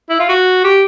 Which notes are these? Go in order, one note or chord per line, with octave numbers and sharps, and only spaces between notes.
E4
F4
F#4
G4